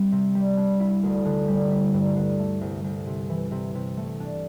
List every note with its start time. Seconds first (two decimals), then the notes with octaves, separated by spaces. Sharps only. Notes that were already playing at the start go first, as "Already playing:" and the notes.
Already playing: G3 C4
0.12 C3
0.35 G3
0.57 D4
0.80 E4
1.03 D2
1.25 D3
1.48 G3
1.71 E4
1.94 G2
2.16 D3
2.39 A3
2.61 C2
2.84 C2
3.06 C3
3.29 E3
3.51 C3
3.75 C3
3.97 A3
4.20 D4